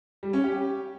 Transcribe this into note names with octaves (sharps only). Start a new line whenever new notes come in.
G3
C#4
G4